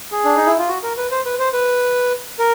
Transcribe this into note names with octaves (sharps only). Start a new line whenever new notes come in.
G#4
D4
D#4
E4
F4
F#4
A#4
B4
C5
B4
C5
B4
A#4